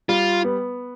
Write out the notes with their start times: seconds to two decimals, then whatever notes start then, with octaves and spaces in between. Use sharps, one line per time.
0.09 G3 F4
0.44 B3